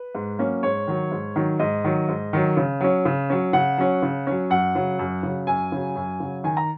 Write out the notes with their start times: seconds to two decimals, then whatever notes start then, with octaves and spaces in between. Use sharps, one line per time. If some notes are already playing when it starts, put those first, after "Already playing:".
Already playing: B4
0.15 G#2
0.39 F#3 A#3 C#4
0.63 G#2 C#5
0.87 D#3 F#3
1.11 G#2
1.36 D#3 F#3
1.59 G#2 D#5
1.84 D#3 F#3
2.09 G#2
2.33 D#3 F#3
2.57 C#3
2.81 F#3 C#4
3.05 C#3
3.30 F#3 C#4
3.53 C#3 F#5
3.78 F#3 C#4
4.02 C#3
4.27 F#3 C#4
4.50 F#2 F#5
4.75 C#3 F#3
4.99 F#2
5.23 C#3 F#3
5.47 F#2 G#5
5.72 C#3 F#3
5.96 F#2
6.20 C#3 F#3
6.44 D#3 G#5
6.57 A#5